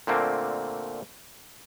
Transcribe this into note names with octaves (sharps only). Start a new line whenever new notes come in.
A#2 D3 A3 A#3 C4